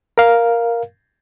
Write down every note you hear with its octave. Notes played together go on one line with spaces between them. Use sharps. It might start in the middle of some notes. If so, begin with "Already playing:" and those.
A#4 F5